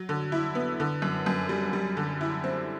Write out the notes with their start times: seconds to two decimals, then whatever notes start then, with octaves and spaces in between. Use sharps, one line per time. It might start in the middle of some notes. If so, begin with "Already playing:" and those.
Already playing: F#3
0.09 D3
0.32 E4
0.55 B3
0.80 D3
1.02 F#2
1.26 F#2
1.49 G3
1.73 G3
1.97 D3
2.21 E4
2.44 C4